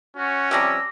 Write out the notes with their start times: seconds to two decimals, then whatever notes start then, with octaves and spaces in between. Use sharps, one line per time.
0.17 C#4 F#4
0.51 C3 F3 G3 D6 E6 A#6